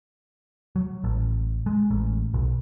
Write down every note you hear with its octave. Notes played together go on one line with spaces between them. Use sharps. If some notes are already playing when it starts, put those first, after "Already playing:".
F#3
A1
G#3
A1
B1